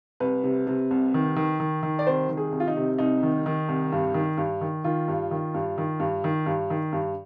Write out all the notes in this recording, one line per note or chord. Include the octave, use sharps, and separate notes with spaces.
C2 B4
C3
C3
C2
D#3
D#3
D#3
D#3
D5
C2 C5
D#3
G#4
C2
F4
D#4
C3
C2 D#4
D#3
D#3
C2
G2
D#3
G2
D#3
D#3 F4
G2
D#3
G2
D#3
G2
D#3
G2
D#3
G2